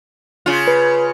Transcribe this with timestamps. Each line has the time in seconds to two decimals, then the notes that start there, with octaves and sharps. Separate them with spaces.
0.46 C#3 F4
0.68 B4